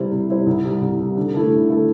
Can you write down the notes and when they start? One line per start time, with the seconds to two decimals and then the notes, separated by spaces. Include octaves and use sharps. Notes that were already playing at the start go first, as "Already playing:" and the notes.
Already playing: C3 G3 E4 C5
0.12 C3
0.29 G3 E4 C5
0.47 C2
0.64 C3 G3
0.82 C2
0.99 C3 G3
1.17 D3
1.34 A3 E4 A4
1.52 D3
1.69 A3 E4 A4